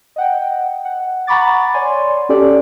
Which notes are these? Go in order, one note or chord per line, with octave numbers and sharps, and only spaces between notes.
D#5 F#5 G5
F#5
F#5 A#5 B5 C#6 D6 A6
C#5 D5 G#5 C6
C#4 G4 A4 D5